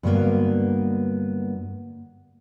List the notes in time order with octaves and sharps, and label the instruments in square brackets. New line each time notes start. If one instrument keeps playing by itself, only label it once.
[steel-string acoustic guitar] G2 D3 F#3 G#3 A#3 B3